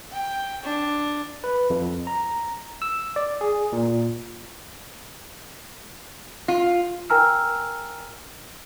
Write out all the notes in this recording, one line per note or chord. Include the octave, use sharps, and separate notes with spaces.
G5
D4
B4
F2
A#5
E6
D5
G#4
A#2
F4
A#4 G5 G#5 A#5 E6 F6